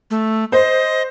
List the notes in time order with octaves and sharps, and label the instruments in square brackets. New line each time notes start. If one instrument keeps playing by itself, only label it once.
[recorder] A3
[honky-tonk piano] C5 [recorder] D#5